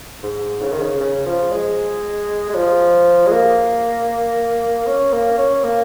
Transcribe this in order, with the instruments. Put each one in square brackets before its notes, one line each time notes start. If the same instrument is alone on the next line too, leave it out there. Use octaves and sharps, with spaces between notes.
[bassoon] G#2
C#3
D#3
C#3
C#3
F3
G#3
G#3
F3
G#3
A#3
C#4
A#3
C#4
A#3